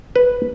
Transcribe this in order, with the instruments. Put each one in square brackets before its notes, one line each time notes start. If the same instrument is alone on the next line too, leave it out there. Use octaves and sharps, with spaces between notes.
[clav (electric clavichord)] B4